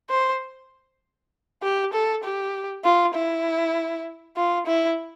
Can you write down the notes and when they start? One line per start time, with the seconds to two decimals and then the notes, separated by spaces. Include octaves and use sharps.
0.10 C5
1.63 G4
1.94 A4
2.24 G4
2.84 F4
3.15 E4
4.37 F4
4.67 E4